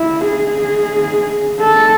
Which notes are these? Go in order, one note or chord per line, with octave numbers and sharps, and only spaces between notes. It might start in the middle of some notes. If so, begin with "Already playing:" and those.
Already playing: E4
G#4
A4